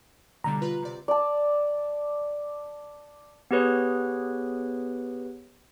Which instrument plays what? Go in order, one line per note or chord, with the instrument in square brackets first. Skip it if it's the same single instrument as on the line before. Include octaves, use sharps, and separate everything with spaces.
[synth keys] B2 D3 G3 [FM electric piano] A#5
[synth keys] F4 B4
C3 D5
[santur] D5 A5
[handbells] B3 G4 G#4 B4 C#5